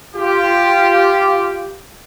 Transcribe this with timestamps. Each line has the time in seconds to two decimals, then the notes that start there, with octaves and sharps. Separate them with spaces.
0.15 F4 G4